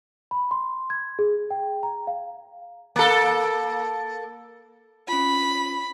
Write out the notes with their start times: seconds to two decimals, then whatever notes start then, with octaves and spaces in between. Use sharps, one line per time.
0.31 B5
0.51 C6
0.90 G#6
1.19 G#4
1.51 G5
1.83 A#5
2.07 F5
2.96 A#3 A4
5.08 C#4 F4 B5